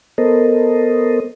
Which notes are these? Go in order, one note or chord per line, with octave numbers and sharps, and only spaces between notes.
B3 A4 A#4 C5 D#5